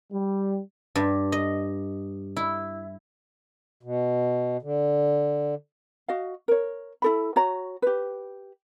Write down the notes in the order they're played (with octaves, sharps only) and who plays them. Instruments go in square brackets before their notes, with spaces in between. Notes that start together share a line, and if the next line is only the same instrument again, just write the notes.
[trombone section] G3
[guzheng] G2
D#5
E4
[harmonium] B2
D3
[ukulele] F#4 D#5 F5
A#4 C#5
E4 A4 B5
F#4 C#5 A#5
G4 B4